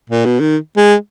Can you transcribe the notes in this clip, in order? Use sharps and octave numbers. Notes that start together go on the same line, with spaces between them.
A#2
B2
D#3
G#3